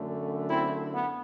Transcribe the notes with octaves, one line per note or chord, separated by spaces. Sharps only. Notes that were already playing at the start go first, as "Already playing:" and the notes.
Already playing: F#2 D3 A3
C4 E4
B3